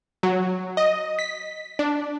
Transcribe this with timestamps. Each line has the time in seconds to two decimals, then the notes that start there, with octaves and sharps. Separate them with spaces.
0.23 F#3
0.77 D#5
1.19 B6
1.79 D4